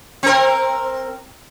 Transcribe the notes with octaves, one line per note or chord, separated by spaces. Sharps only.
C4 A#4